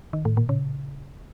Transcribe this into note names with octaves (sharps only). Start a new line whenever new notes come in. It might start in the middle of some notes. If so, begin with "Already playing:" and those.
D#3
A2
A#2
C#3